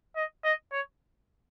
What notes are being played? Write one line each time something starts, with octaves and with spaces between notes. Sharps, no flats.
D#5
D#5
C#5